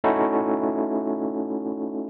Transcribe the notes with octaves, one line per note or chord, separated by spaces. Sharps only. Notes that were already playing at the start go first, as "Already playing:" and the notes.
A3 C#4 D#4 E4 F#4 A4